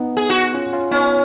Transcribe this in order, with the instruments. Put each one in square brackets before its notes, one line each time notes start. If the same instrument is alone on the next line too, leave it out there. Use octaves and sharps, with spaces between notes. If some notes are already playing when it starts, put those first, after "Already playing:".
Already playing: [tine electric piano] B3 D#4
[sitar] G#4
F#4
[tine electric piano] C#4 F4
C#4 F4
[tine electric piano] B3 D#4 [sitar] C#4